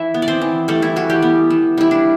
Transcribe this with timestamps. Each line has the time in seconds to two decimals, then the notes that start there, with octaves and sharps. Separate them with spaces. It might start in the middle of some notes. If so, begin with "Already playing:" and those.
Already playing: E3 E4 E5
0.14 B3
0.22 D5
0.28 C4 C5
0.41 E3
0.68 G3 A3 A4
0.82 E4
0.96 E3 F#4
1.10 G3 G4
1.22 B3
1.50 E3
1.78 G3 E4
1.91 D4